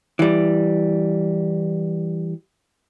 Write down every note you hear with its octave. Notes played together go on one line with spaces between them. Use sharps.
E3 G3